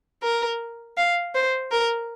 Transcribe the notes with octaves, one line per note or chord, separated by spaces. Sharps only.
A#4
F5
C5
A#4